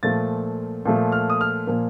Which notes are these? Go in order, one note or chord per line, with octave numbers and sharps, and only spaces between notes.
A#2 F3 A3 A6
A#2 F3 A3
F6
D#6
F6
A#2 F3 A#3